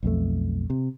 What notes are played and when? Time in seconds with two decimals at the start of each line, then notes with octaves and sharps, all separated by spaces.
0.03 B1 F2 A3
0.70 C3